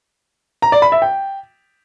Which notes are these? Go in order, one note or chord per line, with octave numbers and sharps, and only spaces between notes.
A#5
D5
B5
E5
G5